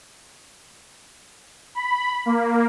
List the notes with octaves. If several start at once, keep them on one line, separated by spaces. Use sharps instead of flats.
B5
A#3